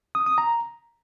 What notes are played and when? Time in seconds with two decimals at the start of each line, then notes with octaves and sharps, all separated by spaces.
0.15 D#6
0.26 D#6
0.38 A#5